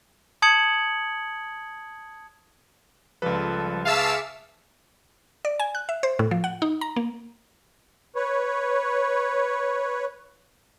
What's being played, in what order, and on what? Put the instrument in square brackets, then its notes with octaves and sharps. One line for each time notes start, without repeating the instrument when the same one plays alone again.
[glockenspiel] A5 D#6 G#6 C#7 F#7
[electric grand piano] C#2 B4 [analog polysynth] F3 G3 A4
[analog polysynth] G#4 C#6 D6 [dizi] E5 [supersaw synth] F5 A5 E6
[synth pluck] D5
G#5
F#6
E5
C5
A2
F3
F#5
D#4
A#5
A#3
[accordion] B4 C#5